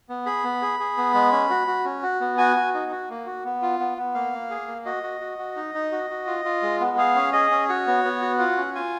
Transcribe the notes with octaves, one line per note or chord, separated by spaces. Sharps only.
B3
G#4 B5
B3
G#4
G#4
B3
G#3
C#4
F#4
F#4
C#4
F#4
B3
F#4 G#5
F#4
D#4
F#4
A#3
F#4
B3
F4
B3
B3
A#3 F5
A#3
G#4
A#3
F#4 D#5
F#4
F#4
F#4
D#4
D#4
F#4
F#4
F4
F4
G#3
B3
G#4 F5
C#4
G#4 D#5
C#4
F#4 C#5
B3
B3
F#4
F4 F#5
C#4
F4 G#5